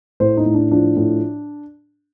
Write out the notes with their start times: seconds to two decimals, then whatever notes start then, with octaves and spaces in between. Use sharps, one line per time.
0.20 A2 C5
0.37 D#4
0.46 A2
0.54 D4
0.71 F3 D4
0.96 A2